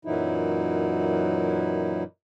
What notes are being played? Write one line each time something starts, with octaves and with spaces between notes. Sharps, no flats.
F#2 A#2 E3 F#3 D#4 E4